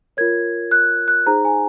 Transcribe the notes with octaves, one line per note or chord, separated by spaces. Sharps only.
F4 A#4 C#5 G#6
F#6
F#6
D#4 G#4 C5 A#5
G#5